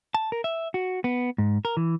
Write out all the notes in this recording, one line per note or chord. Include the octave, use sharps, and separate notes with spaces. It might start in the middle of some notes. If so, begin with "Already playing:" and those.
A5
A#4
E5
F#4
B3
G#2
A#4
E3